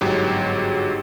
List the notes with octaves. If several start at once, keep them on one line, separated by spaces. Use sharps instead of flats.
G1 G#2 F#3 G4